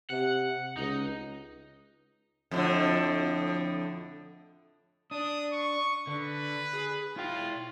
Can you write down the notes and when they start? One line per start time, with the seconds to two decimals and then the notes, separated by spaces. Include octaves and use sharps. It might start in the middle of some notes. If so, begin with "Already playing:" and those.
0.10 C3 F#5
0.77 C#2 D#4
2.51 F2 A2 D3
5.11 D4 D#6
5.53 C#6
6.07 D3 B4
6.73 G#4
7.17 E4 F4 G5